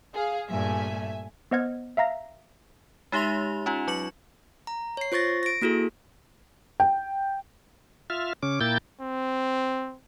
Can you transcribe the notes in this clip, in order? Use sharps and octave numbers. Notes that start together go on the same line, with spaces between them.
G#4 F5
G2 A#2 A3 E5 G#5
B3 C5 D#5 F#5 F6 G#6
E5 F5 A#5 A#6
G#3 D#4 G4 E5 C6 F7
C#4 D#4 F4
F#3 C#6 C#7 F#7
A#5
C#5 C7
F4 C5 C#6 A6 A#6
A#6 D7
A#3 E4 F#4 G#4 A4
G5
F4 E5 F6
C#3 C#4 D6
A#2 A#3 E4 G5 G6 A6
C4